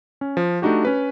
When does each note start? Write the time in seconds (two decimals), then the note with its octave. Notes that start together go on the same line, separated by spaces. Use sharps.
0.21 C#4
0.37 F3
0.62 A3 D4 D#4 F#4 G4
0.85 C#4 B4